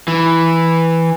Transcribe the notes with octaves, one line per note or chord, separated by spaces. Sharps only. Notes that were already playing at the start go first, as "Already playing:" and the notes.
E3